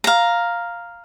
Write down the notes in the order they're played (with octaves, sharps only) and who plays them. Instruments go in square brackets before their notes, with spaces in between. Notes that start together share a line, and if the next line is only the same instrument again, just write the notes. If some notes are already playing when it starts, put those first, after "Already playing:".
[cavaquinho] F5 A#5